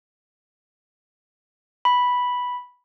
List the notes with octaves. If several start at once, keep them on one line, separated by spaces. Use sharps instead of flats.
B5